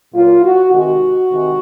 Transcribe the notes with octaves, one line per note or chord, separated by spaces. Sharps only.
A#2 F#3 A#3 F4
F#4
C3 D#3 G#3 F#4
C3 D#3 G#3